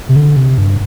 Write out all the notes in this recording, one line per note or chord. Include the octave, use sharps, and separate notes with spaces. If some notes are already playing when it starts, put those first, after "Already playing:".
C3
D3
C3
G2